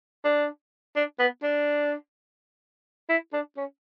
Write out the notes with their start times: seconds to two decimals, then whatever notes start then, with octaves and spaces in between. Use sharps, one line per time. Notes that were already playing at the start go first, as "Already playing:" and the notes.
0.25 D4
0.96 D4
1.20 B3
1.43 D4
3.09 E4
3.33 D4
3.57 C#4